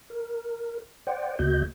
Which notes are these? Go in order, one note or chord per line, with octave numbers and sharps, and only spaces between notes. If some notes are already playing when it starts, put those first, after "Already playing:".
A#4
C5 D5 F#5 G5
D2 C#3 A#3 F#4 D#5 G6